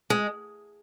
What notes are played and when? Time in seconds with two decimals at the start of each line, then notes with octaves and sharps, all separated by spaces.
0.10 G#3